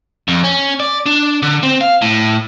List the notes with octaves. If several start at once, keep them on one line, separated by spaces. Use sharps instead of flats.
F2
C#4
D5
D4
D3
C4
F5
A2